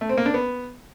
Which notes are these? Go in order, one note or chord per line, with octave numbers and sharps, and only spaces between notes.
A3
C4
A#3
D4
B3